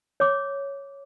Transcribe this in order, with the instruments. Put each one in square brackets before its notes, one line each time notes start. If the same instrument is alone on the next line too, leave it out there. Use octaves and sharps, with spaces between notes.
[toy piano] C#5 D6